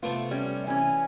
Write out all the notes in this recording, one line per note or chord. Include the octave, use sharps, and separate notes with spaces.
C3 A3 B3 F4
G3 C#4
E3 C#4 G#5